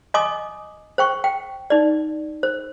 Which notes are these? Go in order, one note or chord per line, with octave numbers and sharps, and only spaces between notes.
D#5 G#5 C6 D6 D#6
C5 G5 C#6
G5
D#4 D5
C5